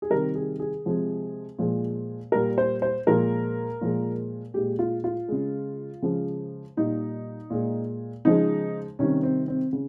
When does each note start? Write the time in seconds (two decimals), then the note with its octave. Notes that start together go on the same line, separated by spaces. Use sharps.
0.02 G#4
0.10 C3 D#3 G3 A#4
0.35 G#4
0.59 G#4
0.85 C3 F3 G#3
1.59 A#2 F3 G#3
2.32 A#2 G3 A#4
2.58 C5
2.82 C5
3.07 A#2 F3 G#3 A#4
3.81 A#2 F3 G#3
4.54 A#2 G#3 G4
4.79 F4
5.04 F4
5.28 C#3 G#3
6.02 C#3 F3 G#3
6.77 A#2 G3 D#4
7.50 A#2 G#3
8.25 C#3 F3 G#3 D#4
8.99 C3 D#3 G3 C#4
9.23 C4
9.48 C4
9.73 C#3